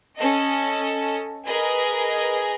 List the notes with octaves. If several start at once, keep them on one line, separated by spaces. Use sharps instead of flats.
C#4 A4 D#5
G#4 A#4 B4 D#5 G#5